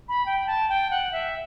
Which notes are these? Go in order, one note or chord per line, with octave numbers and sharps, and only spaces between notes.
B5
G5
A5
G5
F#5
E5